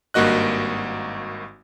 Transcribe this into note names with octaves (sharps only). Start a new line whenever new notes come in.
G#1 G2 A#3 F#4 D#5 F#6